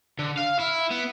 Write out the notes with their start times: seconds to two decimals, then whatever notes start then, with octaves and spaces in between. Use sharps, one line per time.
0.19 D3
0.38 F5
0.60 E4
0.91 B3